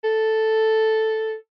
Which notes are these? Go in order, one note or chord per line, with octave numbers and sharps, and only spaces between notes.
A4